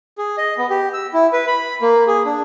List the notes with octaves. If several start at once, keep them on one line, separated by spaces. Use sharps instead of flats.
G#4
D#5
B3
G4
E6
E4
B4
B5
A#3
G#4
D4